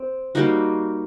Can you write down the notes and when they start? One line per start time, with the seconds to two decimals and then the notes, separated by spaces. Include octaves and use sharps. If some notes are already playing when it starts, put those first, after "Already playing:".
Already playing: C4
0.35 G3 A#3 D#4 F#4